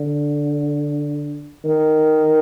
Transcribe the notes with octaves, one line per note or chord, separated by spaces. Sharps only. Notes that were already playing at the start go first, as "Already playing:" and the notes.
Already playing: D3
D#3